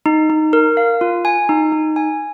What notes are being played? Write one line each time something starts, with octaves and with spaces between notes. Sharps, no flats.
D#4
D#4
A#4
F5
F4
G#5
D#4
D#4
G#5